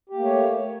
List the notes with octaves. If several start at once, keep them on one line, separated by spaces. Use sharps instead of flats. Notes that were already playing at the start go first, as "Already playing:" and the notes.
A3 A#3 G4 C#5